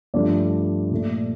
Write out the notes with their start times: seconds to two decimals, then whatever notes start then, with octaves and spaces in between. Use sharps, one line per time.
0.14 G2 F3 A3 D5
0.91 A#2 A3